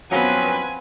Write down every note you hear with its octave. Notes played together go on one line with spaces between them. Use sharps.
F#2 F3 F#3 B3 C4 B4 F5 G#5